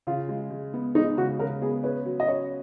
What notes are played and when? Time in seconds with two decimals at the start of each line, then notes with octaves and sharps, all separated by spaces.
0.07 C#3 F4
0.29 G#3
0.51 G#3
0.74 B3
0.95 G#3 D#4
1.17 C#3 F#4
1.39 C#3 A#4
1.61 B3 G#4
1.83 C#4 B4
2.06 F#3
2.20 D#5
2.28 C#4 C#5